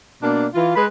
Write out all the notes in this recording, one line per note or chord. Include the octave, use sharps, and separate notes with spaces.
B2 A#3 D4
E3 F4
G#3 B4